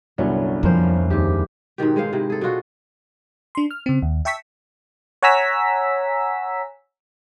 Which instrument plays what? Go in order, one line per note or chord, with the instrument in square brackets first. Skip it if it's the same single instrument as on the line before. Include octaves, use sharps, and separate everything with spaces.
[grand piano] G1 C2 D4 [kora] F#3 C#4
[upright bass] F2 [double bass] F3 [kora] A#3 C#4 C5
[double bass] D#2 [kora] G#2 G4
[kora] G#2 B2 D#3 G4
G#3 G#4 C5 F5
C3 D#3 E4
G#4 A4
B2 D4 F4 F#4
[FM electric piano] D4 C6
F6
C#3 C4
D#2
E5 G5 A5 C#6 E6 B6
C#5 F#5 G#5 A#5 E6 B6